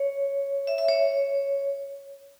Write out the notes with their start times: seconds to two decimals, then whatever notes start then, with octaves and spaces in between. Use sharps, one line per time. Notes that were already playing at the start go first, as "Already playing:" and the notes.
Already playing: C#5
0.67 E5
0.78 E5
0.88 C#5